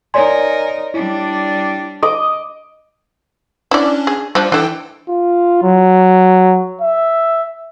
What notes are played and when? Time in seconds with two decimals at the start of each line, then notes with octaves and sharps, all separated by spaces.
0.14 D#4 A#4 C#5 D5 G#5 C6
0.94 G3 D4 E4
2.03 D#5 D6 D#6
3.71 C#4 D4 E4 D5
4.07 G#4
4.35 F3 G3 D4
4.52 E3 D4 E4 A4 G5
5.08 F4
5.63 F#3
6.81 E5